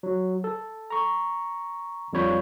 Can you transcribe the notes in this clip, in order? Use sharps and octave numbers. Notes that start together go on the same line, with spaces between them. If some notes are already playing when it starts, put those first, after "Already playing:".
F#3
A4
A#5 C#6
F2 G3 F4 C#5 B5 G6